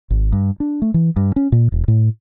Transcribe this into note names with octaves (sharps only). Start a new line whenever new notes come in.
G#1
G2
D4
A3
E3
G2
C#4
A#2
E1
A2